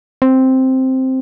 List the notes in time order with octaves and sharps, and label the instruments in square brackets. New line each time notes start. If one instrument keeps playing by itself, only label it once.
[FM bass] C4